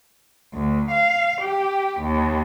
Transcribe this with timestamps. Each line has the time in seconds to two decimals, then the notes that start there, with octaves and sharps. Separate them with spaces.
0.54 D2
0.91 F5
1.41 G4
2.01 D#2